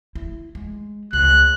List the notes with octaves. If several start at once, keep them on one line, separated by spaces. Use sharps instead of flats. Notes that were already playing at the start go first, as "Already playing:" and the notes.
E4
G#3
C#2 F#6